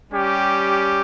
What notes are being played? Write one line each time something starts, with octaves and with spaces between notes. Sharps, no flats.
G3 C#4 G4